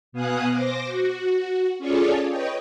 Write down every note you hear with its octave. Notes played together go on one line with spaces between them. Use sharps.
B2 B3 F5 G#5 D#6 F#6
C5 D6 A#6
F#4
C#4 F4 G#4 A4 C#5 D5
B4 C#5 D#5 G5